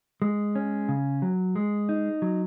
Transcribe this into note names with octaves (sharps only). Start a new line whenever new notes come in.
G#3
C#4
C#3
F#3
G#3
D#4
F#3